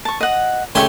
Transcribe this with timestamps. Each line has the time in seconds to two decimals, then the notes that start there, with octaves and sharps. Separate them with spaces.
0.05 A5 C#6
0.21 D#5 F#5
0.75 C#2 A3 G4 C#5 E5 G#5